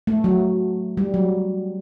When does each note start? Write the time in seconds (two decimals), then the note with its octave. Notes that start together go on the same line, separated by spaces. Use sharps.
0.07 A3
0.24 F#3
0.97 G3
1.14 F#3